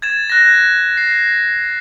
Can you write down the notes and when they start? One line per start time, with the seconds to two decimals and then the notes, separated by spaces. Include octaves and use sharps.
0.02 G#6 A6 E7
0.30 F#6 A#6
0.97 C7